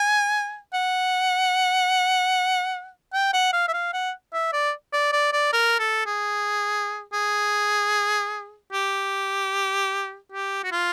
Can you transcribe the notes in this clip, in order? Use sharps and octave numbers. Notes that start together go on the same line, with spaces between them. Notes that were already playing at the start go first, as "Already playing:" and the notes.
Already playing: G#5
F#5
G5
F#5
F5
E5
F5
F#5
E5
D5
D5
D5
D5
A#4
A4
G#4
G#4
G4
G4
F#4
F4